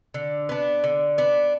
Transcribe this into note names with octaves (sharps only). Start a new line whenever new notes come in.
D3
B3 D4
D3
B3 D4